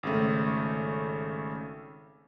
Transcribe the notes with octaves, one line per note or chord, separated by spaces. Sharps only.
G#1 C#3 A3